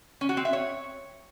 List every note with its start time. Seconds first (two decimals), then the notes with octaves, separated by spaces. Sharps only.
0.21 C#4
0.29 F#4
0.37 C4
0.45 E5
0.53 C#5